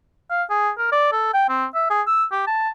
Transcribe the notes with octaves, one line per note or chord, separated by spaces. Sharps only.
F5
G#4
A#4
D5
A4
G5
C4
E5
G#4
E6
G4
A5